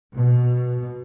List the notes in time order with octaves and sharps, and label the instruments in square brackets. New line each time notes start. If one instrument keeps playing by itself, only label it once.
[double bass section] B2